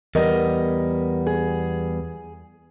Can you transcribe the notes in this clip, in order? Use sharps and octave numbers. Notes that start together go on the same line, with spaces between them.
E2 G3 B3 A#4 D#5
G#4